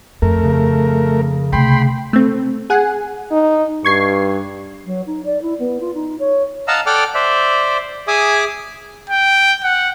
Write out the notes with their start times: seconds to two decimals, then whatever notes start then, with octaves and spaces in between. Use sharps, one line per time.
0.22 F2 A3 A#4
0.44 C#3
1.53 C3 A3 G5 B5 C6
2.13 A3 C4
2.70 G#4 F#5 G#5
3.32 D#4
3.85 G2 C#6 G#6 C7
4.86 F#3
5.07 D#4
5.25 D5
5.42 E4
5.59 B3
5.80 F4
5.95 D#4
6.20 C#5
6.68 D#5 F5 F#5 A5 A#5 E6
6.86 A4 D5 F#5 G5 D6 F6
7.15 C5 D5 E5
8.08 G#4 E5 G#5 D6 D#6
9.10 G5
9.63 F#5